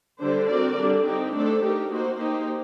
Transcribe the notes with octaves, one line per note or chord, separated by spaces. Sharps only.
D3 G3 D4 A4 C5
C4 F#4 A#4 D5
D3 G3 D4
C4 D#4 G4
A3 D4 A4 C5
A3 D#4 G4 A#4
A#3 D#4 F#4 C5
A#3 D#4 G4 C5